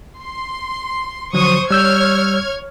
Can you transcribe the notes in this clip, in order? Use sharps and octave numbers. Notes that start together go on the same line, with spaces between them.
C6
D3 F3 F#3 C5 C#6 D#6
G3 C#5 E6 F6 G6 G#6